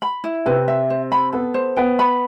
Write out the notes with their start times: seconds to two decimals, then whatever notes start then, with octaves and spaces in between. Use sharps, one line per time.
0.02 B5
0.24 E4
0.46 C3 C4 B4
0.68 E5
0.90 C5
1.12 B5
1.33 B3 A4
1.54 C5
1.77 B3 G5
1.99 B5